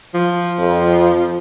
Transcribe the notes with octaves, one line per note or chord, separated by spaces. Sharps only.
F3
F2